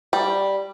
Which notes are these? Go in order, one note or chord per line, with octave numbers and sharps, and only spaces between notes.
G3